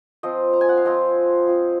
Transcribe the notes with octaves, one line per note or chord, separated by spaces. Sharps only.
F3 C4 F4 D#5
A#5
G#5
F#5
F5
F3 C4 F4 D#5
F3 C4 F4